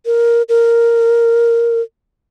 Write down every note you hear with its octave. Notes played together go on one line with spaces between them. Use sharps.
A#4
A#4